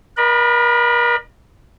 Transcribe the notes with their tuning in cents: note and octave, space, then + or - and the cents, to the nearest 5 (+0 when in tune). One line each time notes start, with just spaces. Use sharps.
A#4 +40 D#5 -40 B5 +0